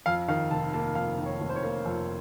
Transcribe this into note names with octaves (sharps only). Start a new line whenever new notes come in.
F2 F5
D#3 F5
F1 A5
A#3 A5
F2 F5
D#3
C#5
F1
C5
C#5
A#3
F2